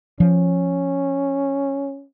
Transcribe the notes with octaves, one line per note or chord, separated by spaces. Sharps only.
F3 C#4